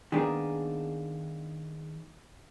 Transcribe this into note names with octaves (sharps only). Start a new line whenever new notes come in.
D#3 G#3 A#3 B3 D4 G#4